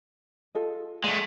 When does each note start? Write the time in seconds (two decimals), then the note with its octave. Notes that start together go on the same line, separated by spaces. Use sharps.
0.55 F4 A4 D#5
1.04 G#3 A3 D5 D#5 F#5